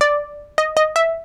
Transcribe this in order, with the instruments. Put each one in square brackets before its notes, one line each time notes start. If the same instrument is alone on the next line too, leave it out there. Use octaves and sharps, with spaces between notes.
[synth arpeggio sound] D5
D#5
D#5
E5